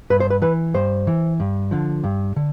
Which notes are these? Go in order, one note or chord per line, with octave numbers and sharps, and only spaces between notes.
G2 B4
C5
B4
E3 B4
G2 C5
E3
G2
D3 F3
G2
D3